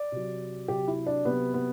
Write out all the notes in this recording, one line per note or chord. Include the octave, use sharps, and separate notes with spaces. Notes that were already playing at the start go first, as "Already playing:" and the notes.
Already playing: D5
C3 F#3
C3 F#3 G4
E4
D4
C3 F#3 B3
B3